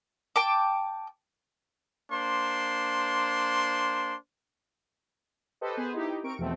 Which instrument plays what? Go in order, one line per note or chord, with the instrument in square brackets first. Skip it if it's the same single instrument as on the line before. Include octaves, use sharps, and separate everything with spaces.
[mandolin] G5 A5 D6
[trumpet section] A#3 D4 C5 C6
[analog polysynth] G4 A4 B4 C5 D#5
B3 G#4 B4 C5
D#4 E4 G4
C4 A#4 C#6 D7
E2 B2 F3 A3 C4